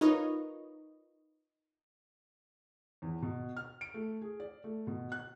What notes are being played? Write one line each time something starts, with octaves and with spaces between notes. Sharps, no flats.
D#4 F4 A#4 B4 C#5 D#5
E2
B2
F6
D7
A3
G#4
D5
A3
B2
F#6